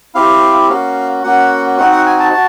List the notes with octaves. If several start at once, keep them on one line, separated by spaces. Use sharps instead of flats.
C4 E4 G4 F5
A#3 C#4 F#4 F5
A#3 C#4 F#4 F#5
C4 D#4 F#4 F#5
F#5
G#5
A5
F#4